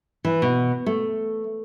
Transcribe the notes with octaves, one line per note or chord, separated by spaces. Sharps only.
E3
B2
A3